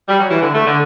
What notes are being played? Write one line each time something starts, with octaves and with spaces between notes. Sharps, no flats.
G3
F#3
E3
D3
A3
D3